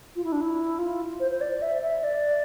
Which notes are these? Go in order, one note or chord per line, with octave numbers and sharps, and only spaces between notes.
F4
E4
D4
E4
F4
C5
C5
D5
E5
E5
D5